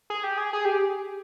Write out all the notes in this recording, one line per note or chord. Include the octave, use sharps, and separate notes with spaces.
G#4
G4
G#4
G#4
G4